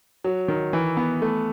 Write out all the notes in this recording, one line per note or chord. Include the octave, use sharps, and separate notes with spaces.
F#3
D#3
E3
B3
A3